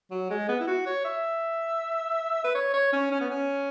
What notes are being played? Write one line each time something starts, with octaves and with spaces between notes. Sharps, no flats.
F#3
G#3
B3
E4
F#4
C#5
E5
B4
C#5
C#5
C#4
C#4
B3
C#4